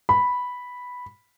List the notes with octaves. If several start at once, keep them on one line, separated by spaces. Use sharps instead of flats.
B5